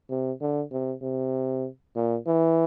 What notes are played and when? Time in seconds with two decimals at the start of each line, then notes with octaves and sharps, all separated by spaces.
0.10 C3
0.41 D3
0.72 C3
1.02 C3
1.95 A#2
2.27 E3